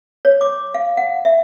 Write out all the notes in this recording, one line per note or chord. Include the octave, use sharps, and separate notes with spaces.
C#5
D6
F5
F#5
E5